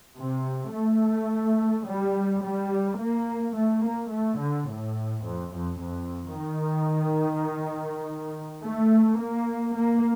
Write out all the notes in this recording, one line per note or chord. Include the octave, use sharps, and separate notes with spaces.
C3
A3
G3
G3
A#3
A3
A#3
A3
D3
A2
F2
F2
F2
D#3
A3
A#3
A#3